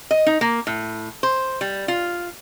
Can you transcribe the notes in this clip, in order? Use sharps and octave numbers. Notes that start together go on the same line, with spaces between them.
D#5
D#4
A#3
A2
C5
G3
F4